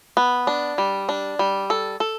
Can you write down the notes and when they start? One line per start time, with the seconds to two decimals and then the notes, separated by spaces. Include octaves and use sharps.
0.17 B3
0.47 D4
0.78 G3
1.09 D4
1.39 G3
1.70 A4
2.00 A4